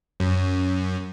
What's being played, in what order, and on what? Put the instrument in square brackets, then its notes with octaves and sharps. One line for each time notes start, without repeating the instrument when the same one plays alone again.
[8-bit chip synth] F#2